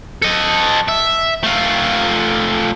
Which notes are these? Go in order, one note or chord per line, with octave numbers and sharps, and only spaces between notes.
A4 D#5
E5
A3 F4